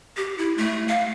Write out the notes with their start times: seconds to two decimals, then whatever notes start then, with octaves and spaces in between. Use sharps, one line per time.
0.17 G4
0.38 E4
0.58 A3
0.88 F5